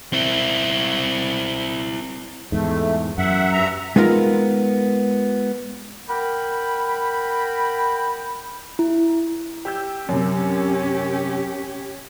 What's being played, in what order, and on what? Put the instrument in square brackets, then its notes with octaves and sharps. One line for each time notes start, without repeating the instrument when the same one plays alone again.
[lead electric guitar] C4 E4
[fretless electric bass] E2 G#2 [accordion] A3
[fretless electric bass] F#2 [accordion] E5 F#5
[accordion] G2 E5 A#5
[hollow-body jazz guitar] G#3 B3 D#4 F4 A#4
[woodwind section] A#4 F#5 G5 B5
[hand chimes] E4
[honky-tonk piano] G4 E6 G6
[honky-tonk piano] F#2 C3 [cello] C#4 G4